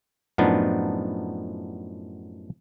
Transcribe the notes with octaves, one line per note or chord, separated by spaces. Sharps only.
F#2 A2 F3 B3 D4 D#4